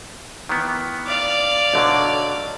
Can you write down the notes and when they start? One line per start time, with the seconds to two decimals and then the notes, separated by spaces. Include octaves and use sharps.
0.49 D#3 E3 B3
1.07 D5 F5
1.74 B1 D3 F#3